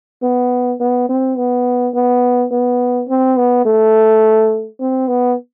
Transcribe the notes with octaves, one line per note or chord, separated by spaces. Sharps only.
B3
B3
C4
B3
B3
B3
C4
B3
A3
C4
B3